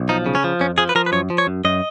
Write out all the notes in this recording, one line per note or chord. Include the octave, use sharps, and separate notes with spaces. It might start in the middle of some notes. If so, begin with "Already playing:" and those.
Already playing: B1
F3 D#4
C#3
C#4
F3
F2 C#4
F3 G#4
B4
F3 A#4
B4
F#2 C#5
F3
C#5
F#2
F#2 D#5